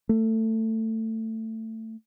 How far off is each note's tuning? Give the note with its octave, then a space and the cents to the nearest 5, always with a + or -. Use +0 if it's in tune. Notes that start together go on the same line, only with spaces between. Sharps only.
A3 +20